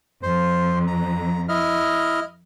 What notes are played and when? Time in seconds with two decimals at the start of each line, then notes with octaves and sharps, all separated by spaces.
0.23 F2 C5
0.87 A#5
1.49 E4 D#5 F6